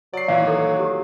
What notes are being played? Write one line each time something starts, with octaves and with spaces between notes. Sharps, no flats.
F#3 D5 C7
A#2 D#3 E3 F5
A4
G4